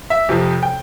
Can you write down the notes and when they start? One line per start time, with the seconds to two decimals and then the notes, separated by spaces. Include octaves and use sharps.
0.10 E5
0.29 F2 C3 F3
0.63 G5